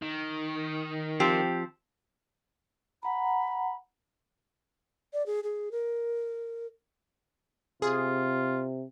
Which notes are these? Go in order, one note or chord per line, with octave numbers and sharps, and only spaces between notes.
D#3
F3 C4 G4
F#5 A#5 B5
D5
G#4
G#4
A#4
C3 F4 G#4